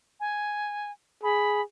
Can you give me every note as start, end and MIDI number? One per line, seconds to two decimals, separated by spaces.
0.20 0.91 80
1.23 1.62 68
1.23 1.61 83